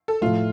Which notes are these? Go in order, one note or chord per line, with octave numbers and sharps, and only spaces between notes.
A4
A2 F3 A3 F4